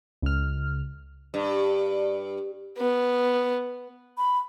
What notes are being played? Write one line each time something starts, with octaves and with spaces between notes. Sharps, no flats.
C#2 F6
G2
B3
B5